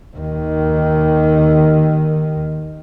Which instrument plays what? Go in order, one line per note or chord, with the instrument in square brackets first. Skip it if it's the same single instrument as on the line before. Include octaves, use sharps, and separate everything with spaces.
[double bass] D#2 D#3